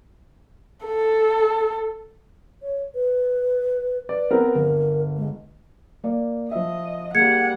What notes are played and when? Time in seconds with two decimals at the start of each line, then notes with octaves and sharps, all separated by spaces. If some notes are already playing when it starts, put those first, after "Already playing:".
0.85 A4
2.62 C#5
2.95 B4
4.09 B4 D5
4.31 B3 C4 A#4
4.55 G1 A#4
5.16 G#3
6.04 A#3 D5
6.51 F3 D#5 E5
7.15 G3 A#3 G#4 F#5 G#6 C#7